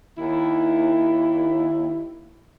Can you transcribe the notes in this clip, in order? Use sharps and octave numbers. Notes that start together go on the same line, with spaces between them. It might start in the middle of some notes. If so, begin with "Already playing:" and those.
D#2 E4